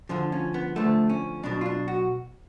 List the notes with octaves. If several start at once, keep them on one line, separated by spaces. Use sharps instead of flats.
D2 D3 F3 F4
C#4
B3
D2 D3 F3 A3
C#4
B1 B2 D4
F4
D4
F#4